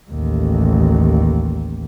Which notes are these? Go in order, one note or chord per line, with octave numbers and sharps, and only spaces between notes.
A1 D#2